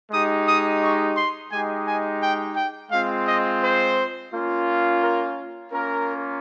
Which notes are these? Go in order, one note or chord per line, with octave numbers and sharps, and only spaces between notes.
G#3 D#4 G4 D#6
D#6
C#6
C6
G#3 D#4 G4 G#5
G#5
G5
G5
G#3 C4 F4 F5
D#5
C5
A#3 C#4 F4
A#4
A#3 C#4 F4 A#4